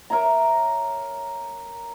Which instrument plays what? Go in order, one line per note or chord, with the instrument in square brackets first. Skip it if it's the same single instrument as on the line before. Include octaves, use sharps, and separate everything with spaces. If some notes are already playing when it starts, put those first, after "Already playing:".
[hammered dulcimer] A#4 C#5 E5 A#5